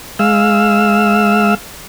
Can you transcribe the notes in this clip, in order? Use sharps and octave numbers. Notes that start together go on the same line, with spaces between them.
G#3 F5 E6